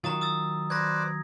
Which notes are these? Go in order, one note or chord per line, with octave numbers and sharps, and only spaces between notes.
D#3 F#3 F4 A#5 D#6 A6
D#6 E6 A6
B4 C5 D5 G#6 A#6